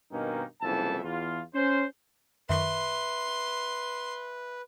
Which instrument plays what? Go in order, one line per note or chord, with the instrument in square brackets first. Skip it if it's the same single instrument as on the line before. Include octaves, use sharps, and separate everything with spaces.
[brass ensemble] G2 B2 D#3 A#3 C#4 D#4
F#1 C2 F2 E3 E5 A5
E2 F4
C#4 C5
[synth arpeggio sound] F#2 D#3 C#6 [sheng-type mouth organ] B4 [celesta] E5 [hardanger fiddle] C6